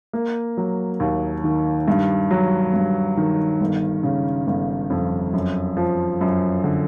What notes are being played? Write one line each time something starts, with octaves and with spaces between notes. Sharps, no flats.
A#3
F#3
D#2
D#3
G2
F#3
G2
D#3
G1
C#3
G1
F2
F#2
F3
F#2
D3